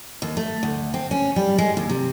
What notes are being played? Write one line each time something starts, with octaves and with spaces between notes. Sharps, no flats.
D#2
A3
D2
C4
C#4
G3
G#3
D#2
C3